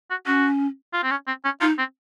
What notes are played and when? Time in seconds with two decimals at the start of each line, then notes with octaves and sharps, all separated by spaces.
0.10 F#4
0.26 C#4 F#4
0.93 F4
1.03 C4
1.11 C#4
1.27 C4
1.44 C#4
1.61 D#4 F4
1.78 C4